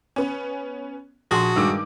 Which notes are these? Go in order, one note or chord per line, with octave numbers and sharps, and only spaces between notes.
B3 C#4
A#1 F#4 G#4 A5 C6 D#6
G2 D#3 G#3 D6 E6 D7